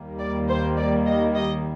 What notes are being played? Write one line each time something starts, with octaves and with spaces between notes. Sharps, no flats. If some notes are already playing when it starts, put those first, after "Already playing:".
Already playing: D#2 D#3 G3 A#3
D5
C5
D5
D#5
D#5